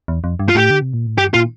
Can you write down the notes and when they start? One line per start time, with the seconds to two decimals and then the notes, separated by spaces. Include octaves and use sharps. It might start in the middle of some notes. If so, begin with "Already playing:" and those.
0.08 E2
0.24 F2
0.39 G2
0.49 F4
0.55 A2 G4
0.70 D3
0.82 C3
0.94 A#2
1.07 A2
1.18 G2 G4
1.34 A#2 F4